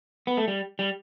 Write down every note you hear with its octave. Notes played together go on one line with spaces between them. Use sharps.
B3
A3
G3
G3